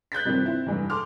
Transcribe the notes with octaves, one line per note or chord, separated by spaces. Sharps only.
F#6 G6 A6 B6
G2 C3 D#3 F3 C4
C4 E4
F1 G2 E3
A4 C6 D6 F6